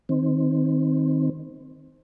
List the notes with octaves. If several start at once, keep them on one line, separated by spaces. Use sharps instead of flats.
D#3 C4